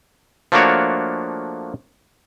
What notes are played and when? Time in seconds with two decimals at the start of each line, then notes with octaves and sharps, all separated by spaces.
0.52 F3 A3 A#3 D4 F#4 C#5